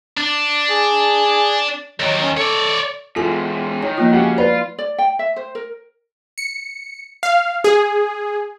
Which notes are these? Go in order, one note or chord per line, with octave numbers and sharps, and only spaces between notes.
D4
G#4
D#2 D#3 F#3
C#4
A4 C#5 D5
E3 G#3 F4 A4 G#5
D#3 C#5
F3 A#3 F4
C#3 F#4 G4 F#5
F4 B4 D5
D5
G5
E5
C5
A#4
C#7
F5
G#4